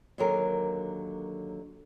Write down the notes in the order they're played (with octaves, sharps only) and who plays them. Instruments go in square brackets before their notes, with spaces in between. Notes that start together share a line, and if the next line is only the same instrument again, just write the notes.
[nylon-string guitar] D#2 D3 F#3 G#4 A#4